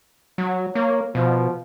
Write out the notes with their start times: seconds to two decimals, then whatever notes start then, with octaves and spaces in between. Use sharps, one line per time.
0.38 F#3
0.75 A#3 C#5
1.15 B2 F3